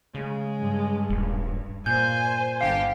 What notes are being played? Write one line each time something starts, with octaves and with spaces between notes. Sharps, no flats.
C#3 G#3
G2
D#1
A#2 C5 G#5 G6
G1 D3 G4 F5